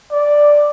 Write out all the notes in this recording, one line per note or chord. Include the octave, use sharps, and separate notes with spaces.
D5